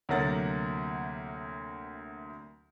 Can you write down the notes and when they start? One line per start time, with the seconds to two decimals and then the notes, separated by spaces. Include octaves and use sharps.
0.09 D2 C3 F#3 A#3 F#5 A6